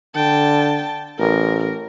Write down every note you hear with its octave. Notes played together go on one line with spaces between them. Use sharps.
D3 G5 A5
A1 A#4